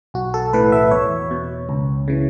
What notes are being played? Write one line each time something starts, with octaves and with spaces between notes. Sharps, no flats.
B1 F#4
A4
A2 E3 B4
E5
E2 C#5
B2
C#2
C#3 E3